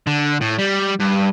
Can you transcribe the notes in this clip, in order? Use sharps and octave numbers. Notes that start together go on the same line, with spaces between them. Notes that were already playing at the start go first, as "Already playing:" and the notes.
D3
A2
G3
G2